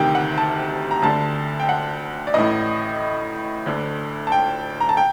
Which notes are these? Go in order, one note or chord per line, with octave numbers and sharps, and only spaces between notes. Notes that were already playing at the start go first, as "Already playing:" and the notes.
Already playing: D2 C3 D#3 G5
F#5
A5
A#5
D2 D3 A5
G5
F#5
D5
A1 A2 D#5
D2 D3
A5
G5
A#5
A5
G5